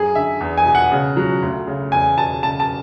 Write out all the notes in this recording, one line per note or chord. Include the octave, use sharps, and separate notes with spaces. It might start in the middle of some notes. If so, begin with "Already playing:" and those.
Already playing: F#2 G#4
D3 E5
E2
G#5
B2
F#5
C#3
F#3
D2
C#3
E2 G#5
B2 A5
C#3 A5
A5